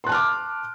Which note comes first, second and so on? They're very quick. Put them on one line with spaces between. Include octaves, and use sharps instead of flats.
C6 F#6 A5 F6 D6